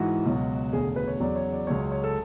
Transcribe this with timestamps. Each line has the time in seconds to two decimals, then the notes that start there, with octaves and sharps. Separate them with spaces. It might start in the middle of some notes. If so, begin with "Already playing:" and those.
Already playing: G#2 E3 F#4
0.25 C#2 B2 F#3
0.73 E1 D2 C#3 G#4
0.96 B4
1.08 C#5
1.20 E2 C#3 F#3 D5
1.36 C#5
1.52 D5
1.67 C#2 C#3 F#3 C#5
1.92 C#5
2.03 A4